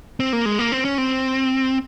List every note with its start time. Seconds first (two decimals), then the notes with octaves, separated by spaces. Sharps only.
0.20 C4
0.33 A#3
0.46 G#3
0.59 A#3
0.72 C4
0.85 C#4
0.98 C4